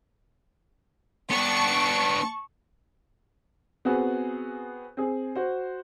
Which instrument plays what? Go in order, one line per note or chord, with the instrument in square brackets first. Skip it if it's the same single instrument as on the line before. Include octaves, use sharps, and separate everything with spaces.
[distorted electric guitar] B3 D4 [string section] A5 C#6
[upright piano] B3 C4 F#4 G#4
C4 G#4
F#4 C5